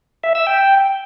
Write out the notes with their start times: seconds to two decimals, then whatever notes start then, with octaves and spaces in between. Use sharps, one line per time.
0.23 E5
0.35 E6
0.47 G5